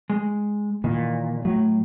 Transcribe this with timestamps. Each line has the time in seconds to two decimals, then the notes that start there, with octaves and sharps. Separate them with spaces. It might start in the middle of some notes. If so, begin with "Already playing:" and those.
0.10 G#3
0.84 A#2 D#3 E3
1.45 A2 F#3